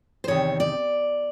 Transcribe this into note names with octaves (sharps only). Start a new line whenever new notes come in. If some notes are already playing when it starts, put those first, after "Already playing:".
C5
E2 C3 D#3 C#5
D5